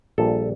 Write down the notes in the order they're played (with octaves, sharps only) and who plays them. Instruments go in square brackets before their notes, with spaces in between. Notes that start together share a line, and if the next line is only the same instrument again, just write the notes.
[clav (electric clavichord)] A#1 A#2 G3 A4